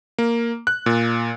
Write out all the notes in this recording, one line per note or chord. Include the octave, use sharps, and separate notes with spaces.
A#3
F#6
A#2